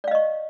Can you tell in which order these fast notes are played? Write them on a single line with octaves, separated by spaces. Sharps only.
D5 F5 D#5 C#6